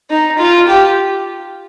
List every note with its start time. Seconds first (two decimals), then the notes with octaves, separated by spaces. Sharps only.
0.11 D#4
0.39 F4
0.68 G4